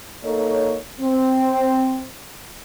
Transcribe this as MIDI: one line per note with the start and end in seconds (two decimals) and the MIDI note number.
0.24 0.77 58
0.24 0.77 63
0.24 0.77 69
0.24 0.77 73
1.01 2.06 60